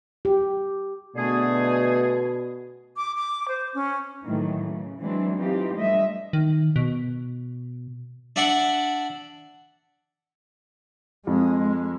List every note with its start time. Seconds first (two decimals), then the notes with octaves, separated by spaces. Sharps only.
0.25 G4
1.16 B2 D3 A3 G#4
2.97 D6
3.15 D6
3.48 C5
3.74 C#4
4.23 A2 D#3 E3 F#3 A3
4.66 C#3
4.99 E3 F#3 G#3 C4 D4 E4
5.37 E3 C4 D#4 F4 G4
5.74 F3 G3 A3 D4 D#5 E5
6.33 D#3
6.76 B2
8.36 D4 D5 E5 F#5
11.27 F2 G#3